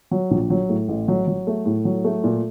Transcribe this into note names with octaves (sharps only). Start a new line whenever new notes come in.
F#3
A#1
F#3
A2
A1
F#3
F#3
A3
A2
F#3
A3
A#2